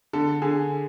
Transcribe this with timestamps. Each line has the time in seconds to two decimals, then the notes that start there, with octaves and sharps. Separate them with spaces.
0.13 D3 A4
0.42 D3 G#4